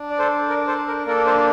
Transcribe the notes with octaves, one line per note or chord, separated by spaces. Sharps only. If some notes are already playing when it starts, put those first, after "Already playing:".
Already playing: D4
D5
A4 C5
A#4 D5
A4 C5
A#4
A#3 D4 A4 A#4
A4 C5